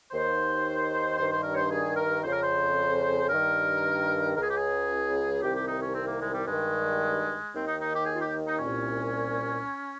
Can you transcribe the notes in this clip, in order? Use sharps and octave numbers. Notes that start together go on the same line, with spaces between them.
D#2 D#3 C5
G2 D#3 C5
C5
A#4
C#5
C5
G#4
A#4
F2 C#3 C5
A#4
C5
G2 D#3 A#4
C#2 C#3 G#4 A#4
G4
G#4
C2 C3 D#3 G4
G4
D#4
C#4
C4
A#3
G#3
G3
G2 D#3 G#3
D#2 D#3 C4
D#4
D#4
G4
G#4
F4
G4
D#4
C2 A#2 C#4